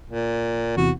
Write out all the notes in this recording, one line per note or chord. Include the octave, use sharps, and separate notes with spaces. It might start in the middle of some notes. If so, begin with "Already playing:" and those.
A#2
E2 C3 E3 F#4